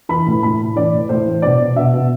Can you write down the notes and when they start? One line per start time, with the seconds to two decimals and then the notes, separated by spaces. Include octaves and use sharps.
0.09 E3 B5
0.26 A2
0.43 A2 B5
0.60 A2
0.76 E3 D5
0.93 A2
1.09 A2 C5
1.26 E3
1.42 B2 D5
1.60 B2
1.76 B2 E5
1.94 B2